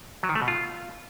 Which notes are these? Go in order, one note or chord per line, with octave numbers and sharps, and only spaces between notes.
F#3
D#3
A3
B2
F4